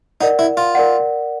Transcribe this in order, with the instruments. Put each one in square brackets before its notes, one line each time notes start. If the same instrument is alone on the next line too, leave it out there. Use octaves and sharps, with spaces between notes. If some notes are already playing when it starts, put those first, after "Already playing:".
[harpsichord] D#4 [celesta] A#4 D5 F#5
[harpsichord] E4
F4
[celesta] A#4 D5 F#5